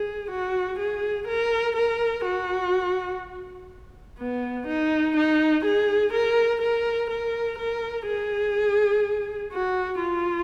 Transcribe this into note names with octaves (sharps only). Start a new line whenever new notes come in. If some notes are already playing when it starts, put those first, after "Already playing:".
Already playing: G#4
F#4
G#4
A#4
A#4
F#4
B3
D#4
D#4
G#4
A#4
A#4
A#4
A#4
G#4
F#4
F4